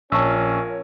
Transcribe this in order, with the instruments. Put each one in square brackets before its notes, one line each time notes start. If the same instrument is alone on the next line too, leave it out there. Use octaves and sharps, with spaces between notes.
[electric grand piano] A#1 [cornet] C#4 [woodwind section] F4 A#4 C#5 [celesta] A5 C#6 E6